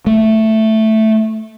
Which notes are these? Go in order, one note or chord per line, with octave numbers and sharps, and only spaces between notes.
A3